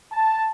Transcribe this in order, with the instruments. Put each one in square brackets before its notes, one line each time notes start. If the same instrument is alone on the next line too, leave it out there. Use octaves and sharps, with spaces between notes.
[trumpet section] A5